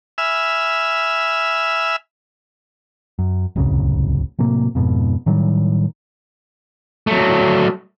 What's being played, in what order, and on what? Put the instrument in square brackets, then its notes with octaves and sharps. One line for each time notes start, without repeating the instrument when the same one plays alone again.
[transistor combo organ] E5 G#5 B5 E6 F6
[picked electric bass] F#2
D1 C2 F#2 C#3
A2 C3 F#3 A#3
F2 G#2 B2
A2 D#3 F#3 G3
[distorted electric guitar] F#3 A3